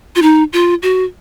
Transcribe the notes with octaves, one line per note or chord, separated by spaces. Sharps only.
F4
D#4
F4
F#4